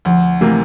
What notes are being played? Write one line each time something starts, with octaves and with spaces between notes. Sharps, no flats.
D2 F3
C3 E3 A3 A#3